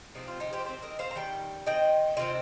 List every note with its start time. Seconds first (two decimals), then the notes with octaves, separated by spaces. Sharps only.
0.15 C3 F3 C4 D#4
0.28 F4
0.40 D#4 G4
0.53 G4 C5
0.65 D#3 C4 G4 C5
0.82 A#4 D#5
0.99 C5 F5
1.11 A#5
1.15 D#3 G3 G5
1.66 D#3 C4 D#5 G5
2.17 C3 D#3 C4 F4